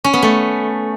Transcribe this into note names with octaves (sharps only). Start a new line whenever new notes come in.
C#4
B3
A3